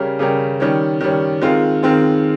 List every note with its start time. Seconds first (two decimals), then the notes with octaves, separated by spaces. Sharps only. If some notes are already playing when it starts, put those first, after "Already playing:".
Already playing: C#3 G3 C#4 G4 A#4
0.19 C#3 G3 C#4 G4 A#4
0.60 D#3 G3 C#4
1.01 D#3 G3 C#4
1.41 D#3 G#3 C4 F4
1.83 D#3 G#3 C4 F4